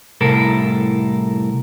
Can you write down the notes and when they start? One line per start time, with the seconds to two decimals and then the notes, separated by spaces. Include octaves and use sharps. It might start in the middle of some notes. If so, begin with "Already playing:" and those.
0.21 C2 A2 A4 A#4